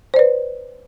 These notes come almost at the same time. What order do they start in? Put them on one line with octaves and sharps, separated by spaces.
C5 D5 B4